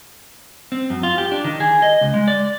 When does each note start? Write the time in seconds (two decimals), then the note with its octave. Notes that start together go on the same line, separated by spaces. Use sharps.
0.72 C4
0.90 F#2
1.03 F4
1.18 G4
1.32 D4
1.44 D#3
1.60 G#4
1.82 D#5
2.01 C#2
2.14 G#3
2.28 D5